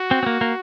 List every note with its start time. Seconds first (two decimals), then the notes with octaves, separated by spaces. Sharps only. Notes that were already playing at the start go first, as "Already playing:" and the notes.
Already playing: F#4
0.11 C4
0.23 C4
0.26 A#3
0.41 A#3